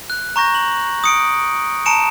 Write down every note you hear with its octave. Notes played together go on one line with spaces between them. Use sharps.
F#6
A#5 C#6 G6 A#6
F#7
D#6 C#7 D7
A5 A#5 C#7 D7 E7